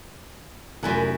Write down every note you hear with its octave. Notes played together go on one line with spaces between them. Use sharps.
F1 F#2 E4 F#5 G#5 F#6